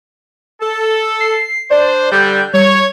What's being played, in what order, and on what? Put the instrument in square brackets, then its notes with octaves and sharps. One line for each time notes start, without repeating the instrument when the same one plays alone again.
[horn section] A4
[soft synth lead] C7
[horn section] D4 C5 [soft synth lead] D5
[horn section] D3 G3 [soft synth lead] G6
[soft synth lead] G3 [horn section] C#5